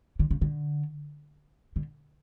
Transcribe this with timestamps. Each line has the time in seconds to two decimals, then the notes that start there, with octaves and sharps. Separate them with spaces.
0.19 D3
0.31 C#3
0.41 D3
1.76 D3